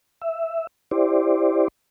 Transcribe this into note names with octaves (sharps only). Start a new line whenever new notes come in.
E5
E4 G4 C5 D5